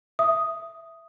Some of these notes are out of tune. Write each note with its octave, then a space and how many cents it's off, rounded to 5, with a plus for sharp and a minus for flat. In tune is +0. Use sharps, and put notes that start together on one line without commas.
E5 +5 D#6 +0